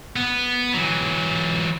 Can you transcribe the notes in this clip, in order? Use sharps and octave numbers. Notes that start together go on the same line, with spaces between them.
B3
E3 F#3